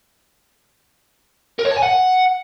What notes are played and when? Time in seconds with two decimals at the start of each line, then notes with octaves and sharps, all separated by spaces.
1.59 A#4
1.65 C#5
1.71 A5
1.77 G#5
1.83 F#5